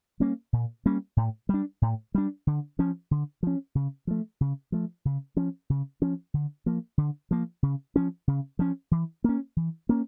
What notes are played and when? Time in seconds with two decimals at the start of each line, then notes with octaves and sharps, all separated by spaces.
0.20 G3 A#3 C#4
0.53 A#2
0.86 G3 A#3 C#4
1.17 A2
1.49 G3 D4
1.82 A2
2.15 G3 D4
2.47 D3
2.79 F3 C#4
3.11 D3
3.43 F3 C#4
3.75 C#3
4.07 F3 A3
4.41 C#3
4.72 F3 A3
5.05 C#3
5.37 F3 C#4
5.70 C#3
6.02 F3 C#4
6.34 D3
6.66 F3 A#3
6.98 D3
7.31 F3 A#3
7.63 C#3
7.96 F3 C#4
8.28 C#3
8.59 F3 C#4
8.91 E3
9.24 A#3 C#4
9.57 E3
9.89 A#3 C#4